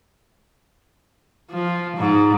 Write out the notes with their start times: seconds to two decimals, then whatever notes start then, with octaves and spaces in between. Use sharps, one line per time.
1.51 F3
1.97 G#2